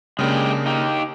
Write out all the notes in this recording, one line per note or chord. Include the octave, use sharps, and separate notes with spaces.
C#3 G#3 A#3 D4 G4
D#4 G4